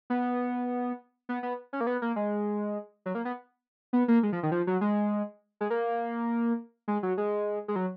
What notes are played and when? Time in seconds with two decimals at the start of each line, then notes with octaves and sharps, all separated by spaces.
0.10 B3
1.29 B3
1.43 B3
1.73 C#4
1.81 A#3
1.87 B3
2.02 A#3
2.16 G#3
3.06 F#3
3.15 A#3
3.25 B3
3.93 B3
4.08 A#3
4.23 G#3
4.33 F3
4.43 D#3
4.52 F3
4.67 F#3
4.81 G#3
5.61 G#3
5.70 A#3
6.88 G#3
7.03 F#3
7.18 G#3
7.68 G#3
7.76 F#3